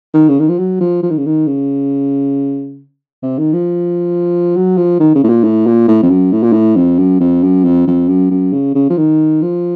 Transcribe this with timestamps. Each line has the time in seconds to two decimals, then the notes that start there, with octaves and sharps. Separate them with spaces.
0.14 D#3
0.29 C#3
0.40 D#3
0.49 F3
0.59 F#3
0.81 F3
1.03 F3
1.10 D#3
1.18 C#3
1.26 D#3
1.47 C#3
3.23 C3
3.38 D#3
3.53 F3
4.56 F#3
4.77 F3
5.00 D#3
5.15 C#3
5.24 A2
5.29 A#2
5.44 A2
5.67 A#2
5.88 A2
6.03 F2
6.11 F#2
6.32 A2
6.43 A#2
6.52 A2
6.76 F2
6.99 F#2
7.20 F2
7.44 F#2
7.64 F2
7.87 F2
8.09 F#2
8.31 F#2
8.53 C#3
8.75 C#3
8.90 F3
8.97 D#3
9.42 F3